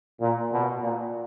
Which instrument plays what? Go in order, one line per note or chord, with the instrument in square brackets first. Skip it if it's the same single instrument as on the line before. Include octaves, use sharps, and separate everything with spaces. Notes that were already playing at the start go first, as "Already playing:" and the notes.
[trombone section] A#2
B2
A#2